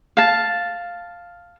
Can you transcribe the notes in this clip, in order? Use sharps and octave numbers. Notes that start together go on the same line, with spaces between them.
F5 A5